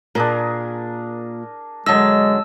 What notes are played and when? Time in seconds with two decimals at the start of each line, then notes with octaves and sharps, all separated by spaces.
0.15 A#2 D4 G#4 A#4
1.86 F#2 D3 F#3 G#3 D#5 A5 E6